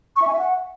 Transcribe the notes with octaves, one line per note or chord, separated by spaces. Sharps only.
C#6
E5
G#5
E5
F#5